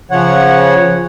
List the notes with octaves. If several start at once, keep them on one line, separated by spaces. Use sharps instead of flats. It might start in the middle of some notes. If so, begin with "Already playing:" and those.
C#3 F3 C#5 F#5